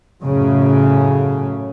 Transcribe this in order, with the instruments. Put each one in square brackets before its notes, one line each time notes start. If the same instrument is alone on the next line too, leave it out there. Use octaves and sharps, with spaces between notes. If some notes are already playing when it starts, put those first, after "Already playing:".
[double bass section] F#2 A2 C#3